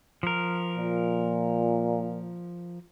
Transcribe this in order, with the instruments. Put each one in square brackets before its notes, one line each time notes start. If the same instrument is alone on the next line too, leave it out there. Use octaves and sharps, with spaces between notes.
[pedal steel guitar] F3 A#4
[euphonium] A#2